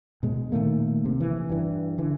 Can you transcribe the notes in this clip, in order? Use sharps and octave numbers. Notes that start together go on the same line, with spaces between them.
B2 G#3
A#2 D#3 A3 A#3
C3
E3
G2 E3
D3 E3